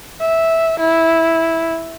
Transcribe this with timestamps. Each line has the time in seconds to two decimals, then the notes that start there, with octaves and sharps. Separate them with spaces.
0.20 E5
0.80 E4